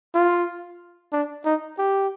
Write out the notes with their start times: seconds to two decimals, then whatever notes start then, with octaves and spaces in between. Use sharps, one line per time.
0.14 F4
1.12 D4
1.45 D#4
1.78 G4